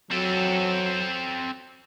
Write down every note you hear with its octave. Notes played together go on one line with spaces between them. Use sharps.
F#3 C4 A4